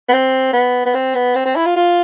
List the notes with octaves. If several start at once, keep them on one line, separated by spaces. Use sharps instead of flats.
B3
C4
B3
B3
C4
B3
C4
C4
E4
F4
F4